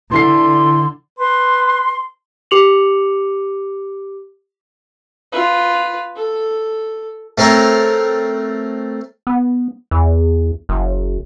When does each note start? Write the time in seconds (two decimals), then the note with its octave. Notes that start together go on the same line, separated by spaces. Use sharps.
0.11 D3 E3 E4 C6 C7
1.19 B4 C6
2.51 G4 D6 C#7 F7 F#7
5.32 F4 B4
6.16 A4
7.38 A3 C4 A#4 C#5
9.27 B3
9.91 E2
10.69 F#1